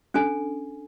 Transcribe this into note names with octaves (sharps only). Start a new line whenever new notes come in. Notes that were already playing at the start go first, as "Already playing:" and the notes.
C#4 D4 A4 G#5